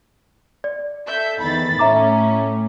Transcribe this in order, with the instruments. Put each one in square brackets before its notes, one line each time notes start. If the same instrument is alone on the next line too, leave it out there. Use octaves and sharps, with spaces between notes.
[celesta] D5
[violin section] A4 E5 G6
[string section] E2 D#3 [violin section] B5 A6
[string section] A2 A3 [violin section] C#4 [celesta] E5 A#5 D6